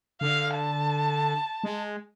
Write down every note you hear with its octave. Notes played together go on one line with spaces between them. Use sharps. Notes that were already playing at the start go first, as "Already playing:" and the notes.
D3 F5
A5
G#3